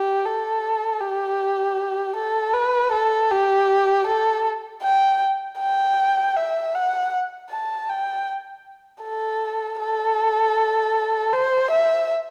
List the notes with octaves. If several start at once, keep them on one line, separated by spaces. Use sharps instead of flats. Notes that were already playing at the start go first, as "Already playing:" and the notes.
Already playing: G4
A4
G4
A4
B4
A4
G4
A4
G5
G5
E5
F#5
A5
G5
A4
A4
C5
E5